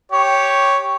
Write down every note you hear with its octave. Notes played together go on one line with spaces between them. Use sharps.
G4 C#5